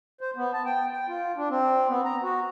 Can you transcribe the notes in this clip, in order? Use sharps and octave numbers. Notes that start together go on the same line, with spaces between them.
C5
B3
A5
G5
G5
F4
D4
C4
B3
A#5
F#4